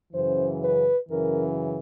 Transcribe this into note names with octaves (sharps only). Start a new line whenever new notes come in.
F#2 C#3 E3 C5
B4
F#2 C#3 E3 A#4